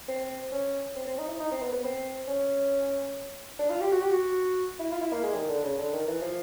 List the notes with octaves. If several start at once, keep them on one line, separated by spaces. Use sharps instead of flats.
C4
C#4
C4
C4
D#4
E4
D#4
C4
B3
B3
C4
C#4
D4
F4
G4
F#4
G4
F#4
E4
F4
E4
A#3
G#3
D#3
D3
C#3
D3
D#3
E3
F3